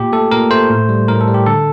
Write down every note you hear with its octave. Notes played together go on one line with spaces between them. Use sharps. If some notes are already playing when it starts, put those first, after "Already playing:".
Already playing: A#2 G4
A3 A4
A#2 A#4
A3 C5
A2
G3
A2 A#4
A4
G3
G4
D3 A4